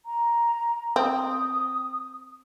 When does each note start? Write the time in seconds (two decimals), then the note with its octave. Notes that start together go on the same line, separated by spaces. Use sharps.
0.06 A#5
0.96 C4 D#6